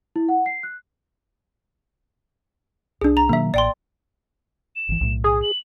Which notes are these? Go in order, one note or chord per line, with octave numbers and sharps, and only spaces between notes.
E4
F#5
C7
F#6
C2 D4 G#4
A#5
B2 D#3 F#3 A#3 E5
A1 D5 G5 C6
E7
G#1 E3
B1 A2 A3
G#4 D#6
F#7